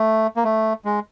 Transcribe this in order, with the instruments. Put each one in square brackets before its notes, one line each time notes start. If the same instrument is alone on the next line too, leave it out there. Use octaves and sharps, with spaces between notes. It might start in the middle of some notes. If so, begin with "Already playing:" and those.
Already playing: [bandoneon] A3
A#3
A3
G#3